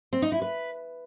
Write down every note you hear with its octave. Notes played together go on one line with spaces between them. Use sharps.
C4
D#4
E4
B4